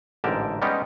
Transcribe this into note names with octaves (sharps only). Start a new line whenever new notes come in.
A1 G#2 D3 G4 A#4 A5
G3 G#3 B3 C#4 D#4 G4